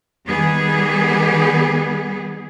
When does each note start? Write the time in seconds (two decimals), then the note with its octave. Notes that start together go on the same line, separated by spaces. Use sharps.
0.25 D#3 G3 B3 G#4